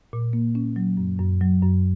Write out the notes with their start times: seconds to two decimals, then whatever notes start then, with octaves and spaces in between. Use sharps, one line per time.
0.13 A#2
0.33 A#3
0.55 C#4
0.76 F#3
0.97 F#2
1.19 F#2
1.41 F#3
1.62 F#2